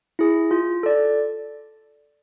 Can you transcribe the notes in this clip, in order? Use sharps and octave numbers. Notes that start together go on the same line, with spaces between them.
E4 G#4
F4
A4 D5